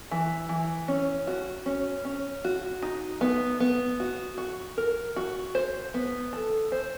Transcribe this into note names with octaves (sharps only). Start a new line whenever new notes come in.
E3
E3
C#4
F#4
C#4
C#4
F#4
D#4
B3
B3
F#4
F#4
A#4
F#4
C5
B3
A4
C5